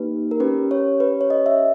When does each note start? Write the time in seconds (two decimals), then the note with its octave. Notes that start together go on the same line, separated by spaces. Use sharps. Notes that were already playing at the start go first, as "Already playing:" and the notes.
Already playing: A#3 D#4 G4 B4
0.31 A#4
0.40 C#4 G4 B4
0.71 C#5
1.00 B4
1.21 C#5
1.30 D#5
1.46 E5